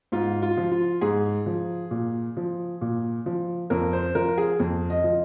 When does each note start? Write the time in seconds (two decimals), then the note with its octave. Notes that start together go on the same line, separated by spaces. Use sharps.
0.12 G#2 F4
0.42 F4
0.57 F3
0.72 F4
1.01 G#2 G#4
1.46 F3
1.91 A#2
2.37 F3
2.81 A#2
3.26 F3
3.70 F2 A#4
3.93 C5
4.15 F3 A#4
4.38 G#4
4.60 F2
4.90 D#5
5.04 F3